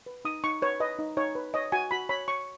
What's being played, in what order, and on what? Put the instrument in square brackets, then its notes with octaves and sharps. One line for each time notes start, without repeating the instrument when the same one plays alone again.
[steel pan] B4
D#4 D#6
D#4 C#6
B4 C#5
B4 D#5
D#4
D#4 C#5
B4
C#5 D#5
F#4 G#5
F#4 B5
C#5 B5
C#5 C#6